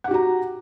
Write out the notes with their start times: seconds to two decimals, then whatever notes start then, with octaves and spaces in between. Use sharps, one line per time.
0.04 F#5
0.08 G4
0.11 F#4
0.14 A#5